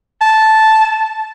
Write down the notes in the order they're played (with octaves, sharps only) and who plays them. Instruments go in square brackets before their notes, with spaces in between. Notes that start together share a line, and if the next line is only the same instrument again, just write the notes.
[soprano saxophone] A5